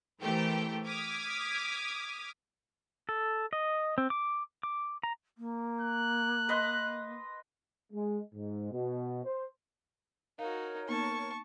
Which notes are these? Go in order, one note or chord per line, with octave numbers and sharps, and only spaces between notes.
E3 A3 G4 A#4 C5 G5
D6 D#6 F6 G#6 B6
A4
D#5
C4
D6
D6
A#5
A#3
F#6
B4 D#5 C6
G#3
G#2
B2
C5
D#4 F#4 A#4 C#5 F5
A#3 B3 D#4 A5 C#6